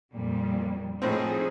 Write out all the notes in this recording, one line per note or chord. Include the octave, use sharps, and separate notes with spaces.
F2 A#2 G3
A2 F3 C4 D#4 G#4